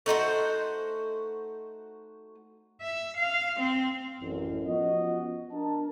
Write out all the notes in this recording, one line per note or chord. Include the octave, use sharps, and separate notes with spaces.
A3 D#4 F#4 C5
E5
F5
C4
A1 F#2
F3 B3 C#4 F4 F#4 D#5
D4 A#4 A5